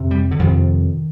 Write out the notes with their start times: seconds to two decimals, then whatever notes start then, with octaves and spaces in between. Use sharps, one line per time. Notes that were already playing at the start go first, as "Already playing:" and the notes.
Already playing: F2 C3
0.11 G3
0.31 D3
0.39 F2 C3 D#3